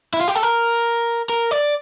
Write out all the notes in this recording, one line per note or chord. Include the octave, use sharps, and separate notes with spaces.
E4
F4
G4
A4
A#4
A#4
D5